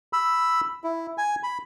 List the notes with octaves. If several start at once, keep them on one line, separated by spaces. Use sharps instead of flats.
B5 E6
E4
G#5
B5